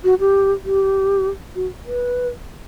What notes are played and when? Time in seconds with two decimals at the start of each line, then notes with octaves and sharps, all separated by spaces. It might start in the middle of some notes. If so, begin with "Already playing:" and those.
0.04 F#4
0.20 G4
0.65 G4
1.55 F#4
1.86 B4